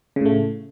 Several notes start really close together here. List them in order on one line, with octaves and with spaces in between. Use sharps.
C#3 A2 A3